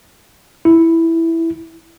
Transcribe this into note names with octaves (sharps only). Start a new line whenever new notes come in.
E4